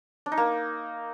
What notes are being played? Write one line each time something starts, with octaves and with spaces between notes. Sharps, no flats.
D4
D#4
A#3